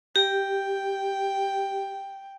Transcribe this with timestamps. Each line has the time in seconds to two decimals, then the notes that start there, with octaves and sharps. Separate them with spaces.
0.16 G4 G5